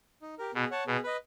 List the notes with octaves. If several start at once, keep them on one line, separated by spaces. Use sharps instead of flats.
D#4
G4 A#4
B2 G#4
C#5 F#5 A5
B2 G#4
B4 D#5